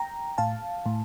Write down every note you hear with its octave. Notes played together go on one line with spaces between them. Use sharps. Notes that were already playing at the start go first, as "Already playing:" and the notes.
Already playing: G5 A#5
A2 F5 A5
A2